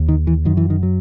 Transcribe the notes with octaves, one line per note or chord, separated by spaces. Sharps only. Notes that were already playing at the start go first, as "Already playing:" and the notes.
Already playing: D#2
D#3
E3
F#2 D#3
E3
D#3
F#3